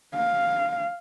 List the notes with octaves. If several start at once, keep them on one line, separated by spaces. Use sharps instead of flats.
F5